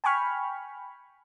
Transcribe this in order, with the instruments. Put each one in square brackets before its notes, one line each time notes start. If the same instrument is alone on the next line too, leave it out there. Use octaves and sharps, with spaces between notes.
[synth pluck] G5 G#5 B5 C#6 F6